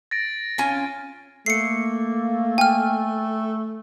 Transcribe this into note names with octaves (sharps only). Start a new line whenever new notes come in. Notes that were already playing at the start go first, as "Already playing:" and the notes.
A6 A#6 D7
C#4 F4 G#5
A3 A#3 C7 C#7
G5 G#5 F6